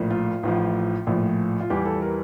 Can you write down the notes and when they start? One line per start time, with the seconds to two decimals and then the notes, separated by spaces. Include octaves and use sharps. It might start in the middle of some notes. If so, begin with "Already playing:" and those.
Already playing: A#1 A2 F3
0.11 F4
0.43 A1 A2 F3
1.07 A#1 A2 F3
1.61 F4
1.70 E2 E3 G3 G4
1.85 A4
2.02 A#4